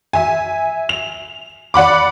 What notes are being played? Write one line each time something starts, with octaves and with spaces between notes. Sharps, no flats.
E5 G#5
F7
D5 F#5 B5 D6